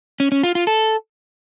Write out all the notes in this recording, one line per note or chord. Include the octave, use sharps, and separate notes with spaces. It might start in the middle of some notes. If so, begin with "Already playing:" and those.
C#4
C#4
F4
F4
A4